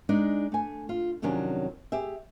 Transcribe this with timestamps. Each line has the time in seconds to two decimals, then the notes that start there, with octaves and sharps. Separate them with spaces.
0.09 G#3 D4 D#4
0.52 A3 G#5
0.89 F4
1.22 F2 C3 D#3 F#3 C#4 D4
1.92 G4 G#4 E5